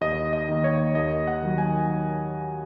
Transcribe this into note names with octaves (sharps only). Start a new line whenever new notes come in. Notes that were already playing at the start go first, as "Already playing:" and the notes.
D#2 D#5
D#5
D#3 A#3
C#5
D#2 D#5
F#5
D#3 F#3
G#5